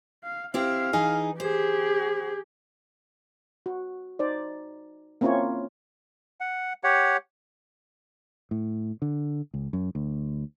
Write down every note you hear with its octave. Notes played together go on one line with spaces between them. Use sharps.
F5
C4 E4 G4 F5
E3 D#4 G#4
G4 G#4 C5
F#4
D#4 C5 D5
A#3 C4 C#4 E4 F4 C#5
F#5
G4 C#5 F#5
A2
D3
C#2
F#2
D2